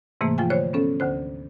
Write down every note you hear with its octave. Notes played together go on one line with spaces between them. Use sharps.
G#2 C3 E3 A3 A#3
F3 F4 G5 G#5
D3 C5 C#5
B3 C#4 A4
D2 D3 C5